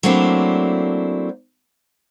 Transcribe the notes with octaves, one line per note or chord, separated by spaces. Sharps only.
F#3 A3 A#3 C4 D4 E4